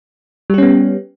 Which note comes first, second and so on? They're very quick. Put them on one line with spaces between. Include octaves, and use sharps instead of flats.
G3 G4 C#4 B3